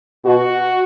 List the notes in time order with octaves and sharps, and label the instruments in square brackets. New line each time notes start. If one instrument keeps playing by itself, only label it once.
[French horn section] B2 F#4